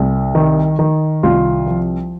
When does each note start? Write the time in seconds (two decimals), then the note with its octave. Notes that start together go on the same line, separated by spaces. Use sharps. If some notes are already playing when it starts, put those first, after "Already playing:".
Already playing: C2
0.35 D#3
0.79 D#3
1.23 C2 F4
1.66 F3